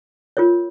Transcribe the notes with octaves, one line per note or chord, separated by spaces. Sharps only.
F4 A#4 C#5